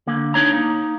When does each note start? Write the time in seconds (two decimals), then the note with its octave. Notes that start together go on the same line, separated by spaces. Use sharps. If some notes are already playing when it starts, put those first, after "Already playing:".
0.07 D3 A#3
0.34 A#3 D4 D#4 C#5 A#5
0.54 A#3 D#4